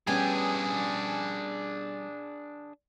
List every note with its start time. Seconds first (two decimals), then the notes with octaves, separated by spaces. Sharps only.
0.07 G3 B3 C#4 D4 G4 G#4 G#5